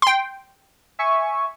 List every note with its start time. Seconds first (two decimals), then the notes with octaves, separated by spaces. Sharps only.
0.02 G5 C6
0.99 E5 G#5 C#6